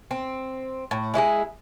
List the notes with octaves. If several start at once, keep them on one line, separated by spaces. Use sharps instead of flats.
C4
A2
G#3 E4 F#4 G#4